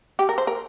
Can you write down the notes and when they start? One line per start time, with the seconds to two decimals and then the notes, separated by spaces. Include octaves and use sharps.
0.19 G4
0.29 A#4
0.38 C5
0.47 A#4